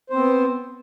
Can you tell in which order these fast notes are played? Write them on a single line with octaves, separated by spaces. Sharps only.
C5 C4 B3